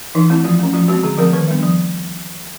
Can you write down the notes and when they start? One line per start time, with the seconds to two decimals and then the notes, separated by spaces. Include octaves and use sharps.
0.15 E3 D#4
0.30 A3 C4 E4
0.44 F3 F4
0.59 A3 C#4
0.74 F3 F4
0.88 G#3 C4 F#4
1.03 D3 G#4
1.18 F3 A3 C4 A#4
1.33 D#3 B4
1.48 G3 B3 D4
1.63 F3